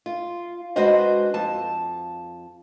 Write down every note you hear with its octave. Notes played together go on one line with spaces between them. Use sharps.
F4
G#3 D4 F#4 B4 C5 D#5
F2 A5